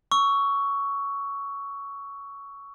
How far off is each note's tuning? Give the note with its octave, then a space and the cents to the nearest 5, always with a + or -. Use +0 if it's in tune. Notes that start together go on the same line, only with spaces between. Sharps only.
C#6 +10 E6 +0